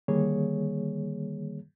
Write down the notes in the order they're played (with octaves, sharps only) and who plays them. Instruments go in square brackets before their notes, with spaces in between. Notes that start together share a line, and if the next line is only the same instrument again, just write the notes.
[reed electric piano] D3 D#3 G3 A#3 G#4 C#5